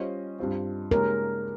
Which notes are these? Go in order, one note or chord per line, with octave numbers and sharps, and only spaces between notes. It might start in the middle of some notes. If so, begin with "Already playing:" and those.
Already playing: G3 C#4 F4 C5 D#5
G2 G3 C4 F4
C#3 G#3 D#4 G4 A#4 C#5